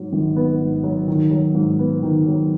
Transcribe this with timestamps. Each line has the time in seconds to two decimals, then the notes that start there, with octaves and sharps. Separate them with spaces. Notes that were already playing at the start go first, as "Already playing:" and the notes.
Already playing: G#2 F#3
0.13 G#1
0.36 B3
0.60 G#2
0.83 F#3
1.07 D#3
1.31 F#3
1.55 G#2
1.79 B3
2.03 D#3
2.27 F#3